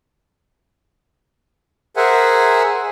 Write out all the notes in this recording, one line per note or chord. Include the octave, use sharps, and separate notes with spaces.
G#4 A#4 C5 E5 F#5 G#5